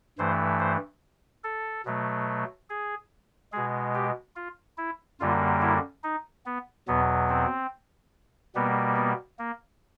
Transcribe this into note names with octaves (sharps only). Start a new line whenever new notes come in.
G2 E3 A3 C5
C5
A4
B2 F#3 A3
G#4
B2 G#3 G#4
G4
F4
E4
F#2 D3 G3 A#3 F4
E4
D#4
B3
E2 B2 F#3 B3
C4
B2 G3 A#3 B3
B3
A#3